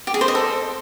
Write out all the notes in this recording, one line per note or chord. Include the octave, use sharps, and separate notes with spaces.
G4
G#4
C5
D#5
A4